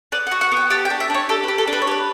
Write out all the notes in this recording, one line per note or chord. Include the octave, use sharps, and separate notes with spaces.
B3 D5
F#5
F#4
F#5
B3 G5
G4 A5
G5
D4
E5
D4 C#5
G4 A4
B4
G4
A4
D4
B4
C#5
G4 B4